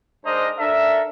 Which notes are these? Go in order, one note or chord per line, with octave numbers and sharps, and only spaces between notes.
G#2 D4 A#4 C5 D#5 A#5
D4 A4 A#4 E5